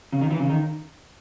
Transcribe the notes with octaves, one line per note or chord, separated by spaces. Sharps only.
C#3
D#3
E3
C#3
D#3